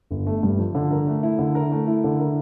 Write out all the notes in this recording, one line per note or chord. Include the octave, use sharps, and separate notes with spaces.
G1
A3
G2
F3
D3
A#4
A3
E4
D3
A#4
A3
E4
D3
A#4